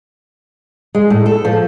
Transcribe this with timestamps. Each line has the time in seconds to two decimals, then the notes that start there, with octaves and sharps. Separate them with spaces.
0.95 G#3
1.10 A2
1.26 A4
1.45 F3